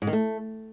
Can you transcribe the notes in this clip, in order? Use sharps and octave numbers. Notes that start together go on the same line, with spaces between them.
G#2
D#3
A3